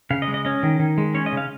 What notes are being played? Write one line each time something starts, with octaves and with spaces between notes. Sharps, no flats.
C#3 F5
D#5
G#3
D#5
C#4 D#5
D#3
D#3
G#3
C#4 C#5
D#5
C#3
F5